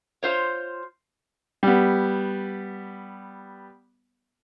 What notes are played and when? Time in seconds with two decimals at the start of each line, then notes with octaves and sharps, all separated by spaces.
0.23 F4 C5 C#5
1.63 G3 B3